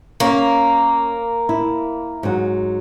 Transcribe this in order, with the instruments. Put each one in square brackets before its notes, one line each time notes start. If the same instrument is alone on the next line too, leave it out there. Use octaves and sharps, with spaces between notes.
[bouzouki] A#3 [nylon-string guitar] C#4 C#5
[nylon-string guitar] E4
G#2 F#3